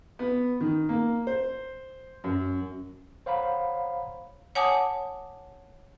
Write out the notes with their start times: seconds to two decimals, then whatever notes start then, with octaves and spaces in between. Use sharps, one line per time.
0.19 B3
0.60 D#3
0.89 A#3
1.27 C5
2.24 F#2
3.26 C5 C#5 F5 F#5 A#5 B5
4.55 C#5 F#5 G#5 A5 D6 D#6